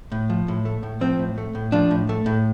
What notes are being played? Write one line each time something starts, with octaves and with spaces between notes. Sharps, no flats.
A2
F3
A2
A3
A2
F3 C4
A2
A3
A2
F3 D4
A2
A3
A2